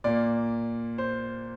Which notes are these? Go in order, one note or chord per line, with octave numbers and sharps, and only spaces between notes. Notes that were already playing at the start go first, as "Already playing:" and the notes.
A#2 A#3 D5
C5